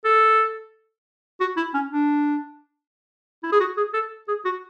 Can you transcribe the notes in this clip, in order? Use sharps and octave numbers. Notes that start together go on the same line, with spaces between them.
A4
F#4
E4
C#4
D4
E4
G#4
F#4
G#4
A4
G#4
F#4